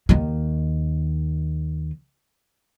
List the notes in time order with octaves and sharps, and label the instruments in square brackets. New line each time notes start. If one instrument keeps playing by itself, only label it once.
[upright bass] D#2 D#3